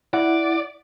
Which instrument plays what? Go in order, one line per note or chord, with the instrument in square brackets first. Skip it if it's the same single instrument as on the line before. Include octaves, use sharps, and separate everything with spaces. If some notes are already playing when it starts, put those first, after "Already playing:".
[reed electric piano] E4 F#5 [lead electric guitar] D5